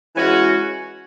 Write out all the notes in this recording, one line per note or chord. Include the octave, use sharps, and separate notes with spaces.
E3 G#3 C#4 F#4